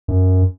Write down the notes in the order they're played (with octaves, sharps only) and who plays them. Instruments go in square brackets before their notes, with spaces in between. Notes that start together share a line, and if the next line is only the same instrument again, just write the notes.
[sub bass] F#2